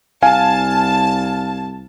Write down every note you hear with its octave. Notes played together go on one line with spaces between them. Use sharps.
C2 F5 G#5 A5